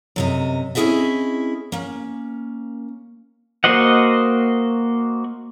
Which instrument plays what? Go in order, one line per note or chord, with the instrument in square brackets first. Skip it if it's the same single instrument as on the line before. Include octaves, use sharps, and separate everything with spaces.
[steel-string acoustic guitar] F#2 C3 D#5
C4 C#4 E4 G#4 D#5 E5
A#3 C#4
[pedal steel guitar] A#3 F#4 C5 D#5 F#5